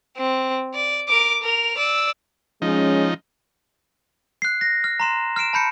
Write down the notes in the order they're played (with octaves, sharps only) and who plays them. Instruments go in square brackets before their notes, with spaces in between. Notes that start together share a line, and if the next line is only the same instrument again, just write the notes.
[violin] C4
D5
A#4 D6
A#4 F7
D5 E6
[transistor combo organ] F3 D#4 [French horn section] G#3 C#4
[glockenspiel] F#6 C7
A#6
F6
A#5 C6 E7
F6 C7 D7 E7
A5 B5 G6 C#7